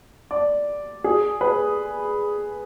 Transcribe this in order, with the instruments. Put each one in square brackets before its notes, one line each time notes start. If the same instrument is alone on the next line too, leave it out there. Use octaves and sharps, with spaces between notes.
[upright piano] D5
G#4
B4